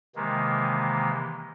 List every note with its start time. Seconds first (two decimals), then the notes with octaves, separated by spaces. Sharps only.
0.15 C3 D#3 E3 G#3 A#3